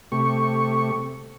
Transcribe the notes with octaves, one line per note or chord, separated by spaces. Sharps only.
C3 A3 G4 C#6